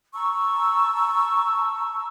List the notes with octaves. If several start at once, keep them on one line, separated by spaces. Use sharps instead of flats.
A5 A#5 C#6 E6